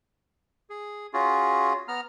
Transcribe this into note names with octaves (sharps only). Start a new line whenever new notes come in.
G#4
C#4 F4 F#4 G#4
B3 A#5 F6